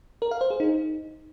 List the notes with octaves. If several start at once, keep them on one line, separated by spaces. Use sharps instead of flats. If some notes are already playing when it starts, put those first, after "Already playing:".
A#4
F5
C5
G#4
D#4